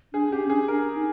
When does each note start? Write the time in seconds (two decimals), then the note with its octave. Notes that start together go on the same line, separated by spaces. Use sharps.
0.13 D4 G#4
0.32 C#4 G4
0.49 D4 G#4
0.68 D4 A#4
0.94 D#4